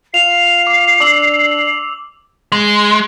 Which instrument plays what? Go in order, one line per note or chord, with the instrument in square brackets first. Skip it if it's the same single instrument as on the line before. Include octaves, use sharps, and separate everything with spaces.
[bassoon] F4 [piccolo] C7 [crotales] F7
[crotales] D6
[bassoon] D4 [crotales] D6 E6 F#7
[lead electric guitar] G#3